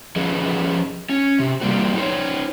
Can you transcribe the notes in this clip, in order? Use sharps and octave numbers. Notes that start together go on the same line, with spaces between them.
F3 C#4 G#4 B4 D#5
C#4
C3
G3 A#3 C4 F#4
D#4 F4 A4 C5 C#5